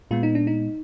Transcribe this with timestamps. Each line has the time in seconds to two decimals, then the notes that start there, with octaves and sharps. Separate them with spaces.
0.11 A#2 G#3 B3 F4
0.23 D#4
0.35 D4
0.47 D#4